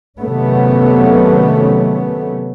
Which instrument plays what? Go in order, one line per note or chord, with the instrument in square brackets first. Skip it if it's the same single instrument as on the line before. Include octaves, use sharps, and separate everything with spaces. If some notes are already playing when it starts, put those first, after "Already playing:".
[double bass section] C3 D#3 F#3 A3 B3 C#4